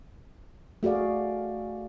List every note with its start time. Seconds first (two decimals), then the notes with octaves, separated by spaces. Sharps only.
0.83 A3 F#4 G#4 D5 F5